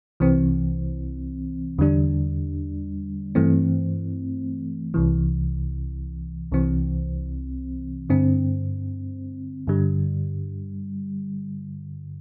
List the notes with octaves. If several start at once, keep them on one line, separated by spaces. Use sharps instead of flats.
C2 C3 E3 C4
E2 D3 G3 D4
G2 E3 A3 C4
C2 C3 E3
C2 C3 E3 C4
G2 D3 C4
G2 D3 G3